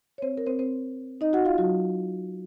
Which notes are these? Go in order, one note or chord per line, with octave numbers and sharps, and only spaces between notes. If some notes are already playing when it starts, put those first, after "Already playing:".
C#5
C4 C5
A#4
C4 C5
C4 C5
D#4 D#5
F#4 F#5
F4 F5
F#3 F#4